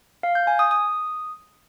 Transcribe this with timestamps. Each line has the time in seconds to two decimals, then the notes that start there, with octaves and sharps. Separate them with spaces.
0.23 F5
0.35 G6
0.47 G#5
0.59 D#6
0.71 D#6